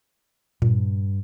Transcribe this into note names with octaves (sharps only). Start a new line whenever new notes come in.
G2 A#2